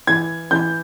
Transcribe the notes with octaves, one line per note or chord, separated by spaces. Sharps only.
E3 G#6
E3 G6